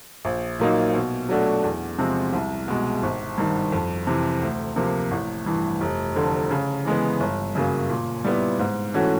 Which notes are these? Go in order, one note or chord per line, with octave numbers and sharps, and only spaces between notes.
A#1
A#2 F#3 A#3 D#4
B2
F#3 A3 D4 F#4
E2
C3 F3 G#3 C4
C2
B2 G#3
G#1
G2 D#3
F2
C3 E3
D2
C3 F3 A#3
A1
G2 E3
F1
F2 D3
C#3
E3 G#3 B3
G1
F#2 C#3 F#3 A#3
A#2
G3 B3 E4
G#2
E3 A3 C#4 F#4